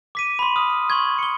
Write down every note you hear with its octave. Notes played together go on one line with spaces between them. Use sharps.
D6 B6 D#7
B5 C6
D#6 F6
C6 C#6 G#6
C#7 G7